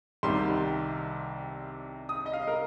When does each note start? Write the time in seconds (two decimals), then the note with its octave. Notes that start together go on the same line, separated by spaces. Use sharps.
0.23 C2 C3 D#3 G3 C6
2.09 D#6
2.26 D#5
2.33 F5
2.47 A#4